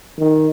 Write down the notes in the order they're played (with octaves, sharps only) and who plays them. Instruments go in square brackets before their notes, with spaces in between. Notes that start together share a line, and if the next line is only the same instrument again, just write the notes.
[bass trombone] D#3